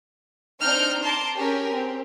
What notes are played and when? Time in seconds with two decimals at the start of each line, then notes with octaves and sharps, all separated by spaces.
0.61 C4 D4 D#4 F6 G6
1.02 A5 A#5 C6 D6
1.35 C#4 G4 G#4 A#4
1.71 C4 G4